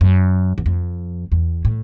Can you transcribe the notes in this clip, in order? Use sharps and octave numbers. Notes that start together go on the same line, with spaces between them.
F#2
E2
F2
E2
A2